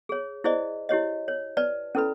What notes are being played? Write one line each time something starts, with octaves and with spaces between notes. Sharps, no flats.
G#4 C#5
E4 G#4 C5 D5 D#5
E4 G4 C#5 D#5
C#5
B4 D5 A5
C#4 E4 A4 B4 B5